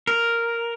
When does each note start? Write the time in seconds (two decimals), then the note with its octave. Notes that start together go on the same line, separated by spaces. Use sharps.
0.07 A#4